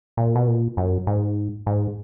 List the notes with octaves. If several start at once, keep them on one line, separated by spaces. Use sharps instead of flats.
A#2
B2
A#2
F#2
G#2
G#2